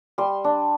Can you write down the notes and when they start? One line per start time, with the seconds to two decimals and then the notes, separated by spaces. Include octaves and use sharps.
0.18 G3 C6
0.44 D4